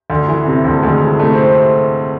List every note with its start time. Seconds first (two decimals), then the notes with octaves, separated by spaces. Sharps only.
0.10 D2
0.28 E3
0.46 C3
0.65 D2
0.72 A3
0.83 D2 G#3
1.01 E3
1.19 C3 A3
1.33 C4